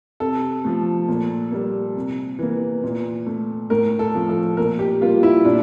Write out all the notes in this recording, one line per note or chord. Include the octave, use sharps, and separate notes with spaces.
C3 A4
F3 A3
A#2
G3 A#3
C3
E3 A#3
A#2
A3
A2 A#4
A4
F3 A3
A4
A#2 A#4
G4
G3 A#3 F4
E4
A#2 D4